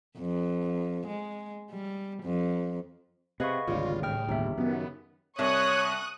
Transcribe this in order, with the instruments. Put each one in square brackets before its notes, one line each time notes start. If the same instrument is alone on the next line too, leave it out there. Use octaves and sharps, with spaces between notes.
[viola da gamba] F2
G#3
G3
F2
[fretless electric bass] C3 [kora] G#4 B4 F#5 [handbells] D#5 F5 C#6
[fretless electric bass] G#1 D2 [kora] C#3 G3 [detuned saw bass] F4
[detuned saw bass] A2 [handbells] G#4 G5 F6
[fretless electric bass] G1 D#2 [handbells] D#4 G4 E5
[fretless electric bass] F#2 D#3 [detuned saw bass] B3
[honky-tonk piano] C2 [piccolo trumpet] C#5 [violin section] C#6 D#6 F#6